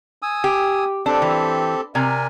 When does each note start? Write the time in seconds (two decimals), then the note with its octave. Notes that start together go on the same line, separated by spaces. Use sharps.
0.22 G#5 D#6 E6
0.44 G4
1.06 C4 D4 G4 A4
1.22 E3
1.95 C3 A#4 D5 G#5